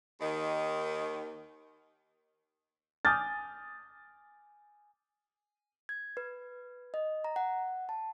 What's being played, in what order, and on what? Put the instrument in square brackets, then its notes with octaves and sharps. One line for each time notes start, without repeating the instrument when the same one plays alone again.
[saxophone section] D#2 D#3
[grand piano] G#5 D6 D#6 F6 G6 A6
[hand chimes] G#6
B4
D#5
A#5
F#5
A5